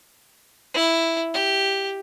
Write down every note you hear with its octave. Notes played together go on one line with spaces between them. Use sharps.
E4
G4